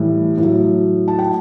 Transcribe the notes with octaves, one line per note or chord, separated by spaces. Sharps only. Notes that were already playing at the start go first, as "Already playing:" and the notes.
Already playing: A2 E3 G3
A2
F#3
A5
G5